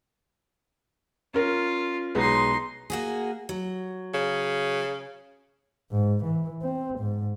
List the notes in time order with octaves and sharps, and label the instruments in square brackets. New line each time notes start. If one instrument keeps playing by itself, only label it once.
[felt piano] C#4 A#4 [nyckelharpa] F4
[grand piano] B1 G#3 B3 [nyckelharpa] D#4 C6
[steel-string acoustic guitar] A#3 F#4 G#4
F#3
[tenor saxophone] C#3
[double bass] G#2
E3
C4
G#2